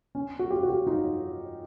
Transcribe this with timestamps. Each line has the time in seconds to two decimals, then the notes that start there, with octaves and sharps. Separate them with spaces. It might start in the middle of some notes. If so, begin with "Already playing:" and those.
0.15 C#4
0.39 F#4
0.50 F4 G4
0.63 F#4
0.68 F4 G4
0.87 D#4 F4